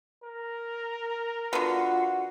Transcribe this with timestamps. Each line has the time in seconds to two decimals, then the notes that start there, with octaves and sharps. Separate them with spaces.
0.24 A#4
1.53 D3 B3 F4 F#4 F5 F#5